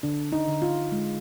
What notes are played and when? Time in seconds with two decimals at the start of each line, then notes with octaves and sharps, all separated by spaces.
0.03 D3 D4
0.32 D#4
0.47 D3
0.62 F4
0.92 G#3